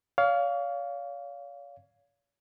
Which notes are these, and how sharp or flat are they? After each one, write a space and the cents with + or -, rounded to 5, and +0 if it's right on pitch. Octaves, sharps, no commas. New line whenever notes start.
C#5 +40 F5 +0